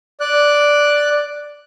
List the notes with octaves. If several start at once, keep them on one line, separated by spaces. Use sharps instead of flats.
D5 F#6